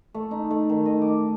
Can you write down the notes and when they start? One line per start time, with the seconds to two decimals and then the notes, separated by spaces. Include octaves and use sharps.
0.14 A3
0.31 D#4
0.51 A3
0.70 D#3
0.86 D#5
1.02 D6